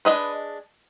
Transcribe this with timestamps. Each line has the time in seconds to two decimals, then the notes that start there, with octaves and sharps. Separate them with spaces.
0.05 G#3 D4 B4 D#5